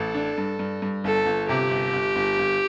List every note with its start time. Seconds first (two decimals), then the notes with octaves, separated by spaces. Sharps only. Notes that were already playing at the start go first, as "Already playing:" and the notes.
Already playing: A1 A4
0.14 D4
0.38 G2
0.59 G2
0.82 G2
1.04 G1 A4
1.26 G1
1.49 C3 G4
1.71 G1
1.93 G1
2.16 G1
2.39 G1